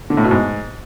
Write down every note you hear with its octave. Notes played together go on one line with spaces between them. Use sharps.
D3
A2
B2
G#2